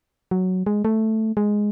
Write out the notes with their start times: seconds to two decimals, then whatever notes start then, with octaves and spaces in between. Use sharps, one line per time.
0.31 F#3
0.67 G#3
0.85 A3
1.37 G#3